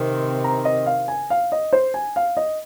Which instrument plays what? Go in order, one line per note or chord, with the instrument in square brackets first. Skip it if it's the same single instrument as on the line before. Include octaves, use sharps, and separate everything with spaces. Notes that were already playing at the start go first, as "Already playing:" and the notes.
Already playing: [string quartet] C3 D#3 C4
[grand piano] A#5
D#5
F5
G#5
F5
D#5
C5
G#5
F5
D#5